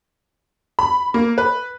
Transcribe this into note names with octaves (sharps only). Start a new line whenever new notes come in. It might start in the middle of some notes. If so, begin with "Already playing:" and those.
B5
A#3
B4